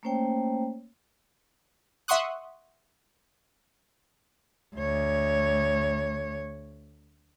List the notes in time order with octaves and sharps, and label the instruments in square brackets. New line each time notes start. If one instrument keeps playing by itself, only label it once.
[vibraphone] A3 A#3 C#4 C5 C#5 G5
[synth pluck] E5 F#5 C6 C#6 D#6 F#6
[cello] D2 C#5